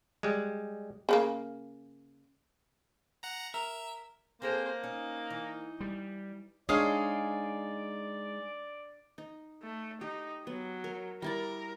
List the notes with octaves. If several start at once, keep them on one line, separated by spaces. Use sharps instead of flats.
G3 G#3
C#3 F#3 A#3
F#5 A#5
A#4 E5
A#3 C4 G#4 A4 C5
C#4 D#4
E3
G3
G#3 D4 D#4 G#4 C#5 D5 F5
D#4
A3
D#4 G4
F#3 B3
A#4
G3 E4 A#4 D5